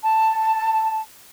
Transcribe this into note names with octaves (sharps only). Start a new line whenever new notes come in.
A5